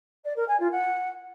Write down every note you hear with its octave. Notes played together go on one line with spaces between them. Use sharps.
D5
A#4
G#5
F4
F#5